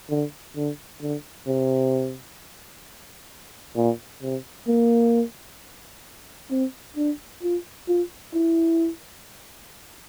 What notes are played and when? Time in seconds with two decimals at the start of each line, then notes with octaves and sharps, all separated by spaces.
0.10 D3
0.56 D3
1.01 D3
1.48 C3
3.76 A#2
4.22 C3
4.68 A#3
6.51 C4
6.97 D4
7.43 F4
7.88 F4
8.34 E4